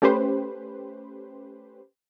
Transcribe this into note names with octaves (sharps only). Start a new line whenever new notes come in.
A3 C#4 G4 B4 C5